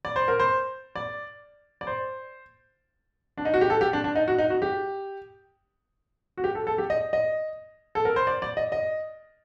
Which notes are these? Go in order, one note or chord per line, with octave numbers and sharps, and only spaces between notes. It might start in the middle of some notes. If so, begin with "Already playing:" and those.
D5
C5
A#4
C5
D5
D5
C5
D4
D#4
F#4
G4
A4
G4
D4
D4
D#4
F#4
D#4
F#4
G4
F#4
G4
A4
A4
G4
D#5
D#5
A4
A#4
C5
D5
D5
D#5
D#5